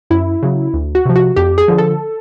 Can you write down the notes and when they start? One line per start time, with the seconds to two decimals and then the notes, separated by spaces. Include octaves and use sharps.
0.10 F#2 E4
0.43 C#3 F#3
0.74 D2
0.95 F#4
1.05 C3 F3
1.16 F#4
1.36 F2 G4
1.58 G#4
1.68 D3 F3
1.78 A4